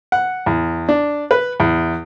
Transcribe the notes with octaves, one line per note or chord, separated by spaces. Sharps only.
F#5
E2
D4
B4
E2